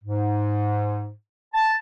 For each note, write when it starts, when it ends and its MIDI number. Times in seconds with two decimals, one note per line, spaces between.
0.04 1.12 44
1.54 1.75 81